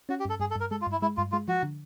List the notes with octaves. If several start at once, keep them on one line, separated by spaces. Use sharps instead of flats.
C#4 F#4
G4
G2 A4
G2 G#4
A4
G2 A#4
G#3 A4
F4
G2 E4
G#3 E4
G2 F4
G#3 F4
F3 F#4
D3